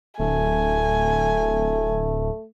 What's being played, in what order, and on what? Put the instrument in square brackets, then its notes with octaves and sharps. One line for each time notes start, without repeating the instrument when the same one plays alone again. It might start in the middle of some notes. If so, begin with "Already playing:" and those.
[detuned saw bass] D1 [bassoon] A3 [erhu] G#5